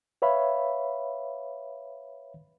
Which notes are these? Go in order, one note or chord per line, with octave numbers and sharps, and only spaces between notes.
B4 C#5 E5 F5 B5